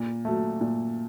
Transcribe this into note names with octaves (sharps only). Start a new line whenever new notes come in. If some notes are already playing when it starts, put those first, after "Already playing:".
Already playing: A#2
F#3 A3
A#2